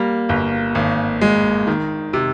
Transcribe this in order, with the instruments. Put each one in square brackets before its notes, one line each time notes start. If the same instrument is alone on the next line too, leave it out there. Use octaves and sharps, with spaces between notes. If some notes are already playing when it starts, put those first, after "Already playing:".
Already playing: [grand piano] G3 [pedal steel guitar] A#3
[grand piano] G1
G#1
G#3
D#3
C3